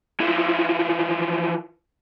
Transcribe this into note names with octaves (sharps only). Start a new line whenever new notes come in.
E3 F3